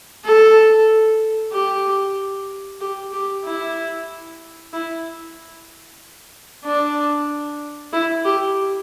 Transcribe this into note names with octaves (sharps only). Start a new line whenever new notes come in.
A4
G4
G4
G4
E4
E4
D4
E4
G4